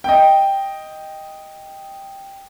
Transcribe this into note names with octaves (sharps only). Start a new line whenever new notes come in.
D#5 G5